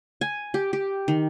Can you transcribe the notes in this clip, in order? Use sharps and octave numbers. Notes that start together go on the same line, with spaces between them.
G#5
G4
G4
D#3